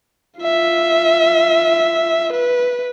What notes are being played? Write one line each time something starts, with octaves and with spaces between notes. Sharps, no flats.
F4 E5
B4